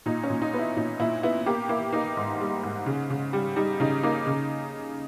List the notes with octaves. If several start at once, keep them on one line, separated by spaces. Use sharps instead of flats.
A#2 D#4
C#4
A#2
D#4
B3 E4
A#2 D#4
A#2 E4
B3 E4
A#3 G4
A#3 E4
A#3 D#4
G#2
G3
G#2
C#3
C#3
G3
G3 D#4
C#3 D#4
A#3 D#4
C#3